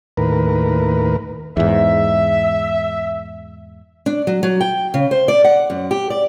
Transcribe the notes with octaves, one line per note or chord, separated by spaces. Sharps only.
D#2 A2 A#4 B4
E2 G#2 E5
D4
F#3
F#3
G5
C#3
C5
D5
F#5
F#2
G4
D5